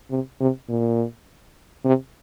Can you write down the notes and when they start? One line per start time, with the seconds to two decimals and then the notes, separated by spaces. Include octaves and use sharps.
0.11 C3
0.41 C3
0.69 A#2
1.85 C3